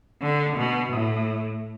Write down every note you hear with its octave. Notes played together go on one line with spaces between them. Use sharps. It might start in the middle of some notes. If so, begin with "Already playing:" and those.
D3
B2
A2